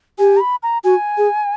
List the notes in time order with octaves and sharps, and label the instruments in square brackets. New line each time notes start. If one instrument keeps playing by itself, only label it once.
[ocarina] G4 [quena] G#5
[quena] A#5
B5
A#5
[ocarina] F#4 [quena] G#5
[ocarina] G#4